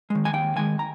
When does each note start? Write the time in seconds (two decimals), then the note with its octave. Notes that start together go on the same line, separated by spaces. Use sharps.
0.10 D#3 G#3
0.25 G#5
0.33 D#2 G5
0.56 D#3 G#3 G#5
0.79 A#5